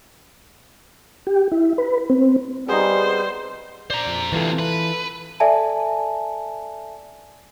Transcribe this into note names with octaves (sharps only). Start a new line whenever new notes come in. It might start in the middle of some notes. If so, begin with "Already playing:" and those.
G4
E4
B4
C4
G3 B3 D#4 G#4 C5
C5 D5 A#5
F2
D2 C3 E3 F4 A4
B4
A4 D5 E5 G#5 A5